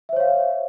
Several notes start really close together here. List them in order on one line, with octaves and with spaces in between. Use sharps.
E5 C5 C#5 F5